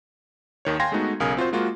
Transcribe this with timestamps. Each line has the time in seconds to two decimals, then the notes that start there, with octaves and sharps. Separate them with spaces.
0.65 D#2 D#3 C#5
0.80 F5 G5 G#5 C6 G#6 A#6
0.92 G#3 A3 B3 D#4 F#4
1.20 B1 C#3 A#4 F5 G#5 D#6
1.37 C4 F4 F#4 C5
1.53 G#3 A#3 F4 F#4